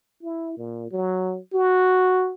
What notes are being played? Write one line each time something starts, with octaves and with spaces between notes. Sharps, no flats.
E4
A#2
F#3
F#4